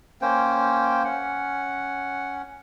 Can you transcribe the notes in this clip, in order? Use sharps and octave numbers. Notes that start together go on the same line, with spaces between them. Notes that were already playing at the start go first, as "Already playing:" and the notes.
A#3 C#4 C5 G5
C#4 F#5